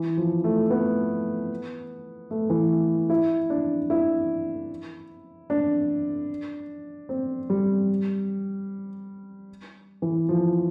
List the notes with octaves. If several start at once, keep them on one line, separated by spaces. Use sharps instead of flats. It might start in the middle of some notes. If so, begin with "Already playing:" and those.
Already playing: E3
F3
A3
B3
A3
E3
E4
D4
E4
D4
C4
G3
E3
F3